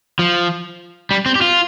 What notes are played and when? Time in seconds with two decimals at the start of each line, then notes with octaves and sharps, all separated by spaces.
0.19 F3
1.11 G3
1.26 C4
1.35 G4
1.42 F4